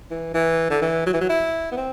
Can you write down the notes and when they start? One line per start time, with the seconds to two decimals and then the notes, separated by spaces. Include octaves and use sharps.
0.11 E3
0.34 E3
0.70 D3
0.82 E3
1.06 F#3
1.13 E3
1.21 F#3
1.29 E4
1.72 B3
1.77 C4